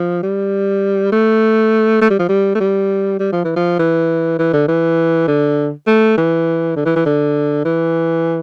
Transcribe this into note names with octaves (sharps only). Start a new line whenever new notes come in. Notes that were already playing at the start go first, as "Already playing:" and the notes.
Already playing: F3
G3
A3
A3
G3
F3
G3
A3
G3
G3
F3
E3
F3
E3
E3
D3
E3
D3
A3
E3
D3
E3
E3
D3
E3